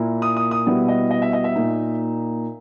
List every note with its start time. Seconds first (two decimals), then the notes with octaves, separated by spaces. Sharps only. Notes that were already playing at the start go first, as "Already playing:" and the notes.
Already playing: A#2 A#3 E4
0.22 D#6
0.37 D#6
0.51 D#6
0.66 B2 G3 B3 E4
0.88 D#5
1.11 D#5
1.22 E5
1.33 D#5
1.44 E5
1.55 A#2 A#3 D#4